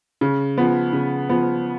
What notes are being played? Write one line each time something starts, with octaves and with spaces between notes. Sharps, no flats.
C#3
F3 B3
C#3
F3 B3